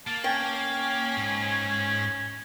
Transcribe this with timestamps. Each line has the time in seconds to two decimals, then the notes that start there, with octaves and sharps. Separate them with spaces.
0.07 A#3 A5
0.24 C#4 G5
1.17 G#2